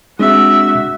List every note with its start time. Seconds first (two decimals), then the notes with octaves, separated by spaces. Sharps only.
0.19 G#3 C4 D4 F#4 E5